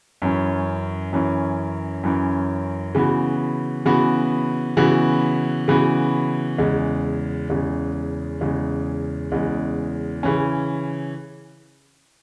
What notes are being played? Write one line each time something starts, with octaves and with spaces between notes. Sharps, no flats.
F#2 E3 C#4
F#2 E3 C#4
F#2 E3 C#4
C#3 E3 B3 F#4
C#3 E3 B3 F#4
C#3 E3 B3 F#4
C#3 E3 B3 F#4
E2 C#3 G#3
E2 C#3 G#3
E2 C#3 G#3
E2 C#3 G#3
C#3 E3 C#4